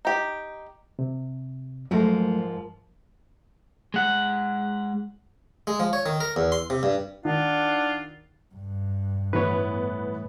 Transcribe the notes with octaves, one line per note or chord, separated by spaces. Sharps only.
D#4 G4
C3
G#2 F3 F#3 A3 A#4
G#3 F#5
G#3
F3
C#5
D#3
A#4
E2
C6
C3
G2
D#3 D4 F4 F#5
G2
A2 E3 G3 B3 B4 C#5